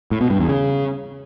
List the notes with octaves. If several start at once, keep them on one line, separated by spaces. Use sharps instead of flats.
A2
B2
G2
E2
C#3